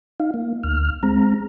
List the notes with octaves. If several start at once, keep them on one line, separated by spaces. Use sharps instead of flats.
D#4 F5
A#3
D2 F6
G#3 C4 A#5